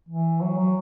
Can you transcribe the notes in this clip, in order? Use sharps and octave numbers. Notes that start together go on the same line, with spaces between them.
E3
F#3
F#3